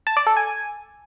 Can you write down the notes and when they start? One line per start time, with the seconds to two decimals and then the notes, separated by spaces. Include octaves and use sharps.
0.07 A5
0.17 D5
0.27 A4
0.37 G#5